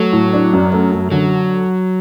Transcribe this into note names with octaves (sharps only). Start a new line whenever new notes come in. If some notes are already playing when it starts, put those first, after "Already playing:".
Already playing: F#3 A3
A2
D4
F#2
A3
F#2
D3 F#3